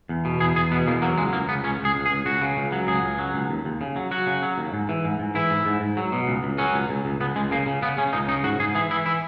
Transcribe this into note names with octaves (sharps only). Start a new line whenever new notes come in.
E2
B2
E2 G#4
E2 G#4
B2 B3
E2 A#3
F#3 A#3
C#2 G#3
C#2 A#3
C#2 B3
C#2 C#4
C#2
G#4
C#2
G#4
C#2
C#2 F#4
C#3
C#2
F#3
C#2 G#4
C#2
F#3
C#2
D#2
D#2
C#3
F#3
F#3 F#4
C#3
F#3
D#2
G#2
E3
G#2
G#2
E3 E4
G#2
G#2
G#2
F#3
B2
C#2
C#2
F#3 C#4
C#2
C#2
C#2
C#2 B3
C#2 G#3
C#3 A#3
C#3
C#3 B3
C#3 C#4
C#2 D#4
C#3 D#4
G#2 F#4
G#2 G#4
E3 G#4
E3 E4
E3 E4